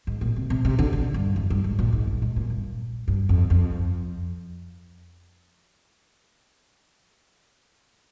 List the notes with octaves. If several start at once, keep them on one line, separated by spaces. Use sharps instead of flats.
G#2
A#2
C3
C3
C3
D3
D3
G2
F2
G2
G#2
A#2
G#2
G2
G#2
A#2
G2
G2
F2
F2